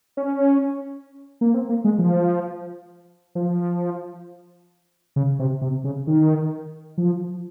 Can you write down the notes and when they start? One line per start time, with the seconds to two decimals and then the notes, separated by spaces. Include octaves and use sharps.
0.17 C#4
1.41 A#3
1.54 C4
1.69 A#3
1.84 G#3
1.99 F3
3.35 F3
5.16 C#3
5.39 C3
5.62 C3
5.84 C#3
6.07 D#3
6.98 F3